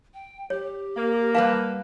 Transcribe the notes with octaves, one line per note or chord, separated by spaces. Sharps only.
G5
G4 C#5
A#3
G3 B4 F5 F#5 A5